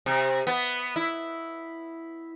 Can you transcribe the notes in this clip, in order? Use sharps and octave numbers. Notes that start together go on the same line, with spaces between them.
C3
B3
E4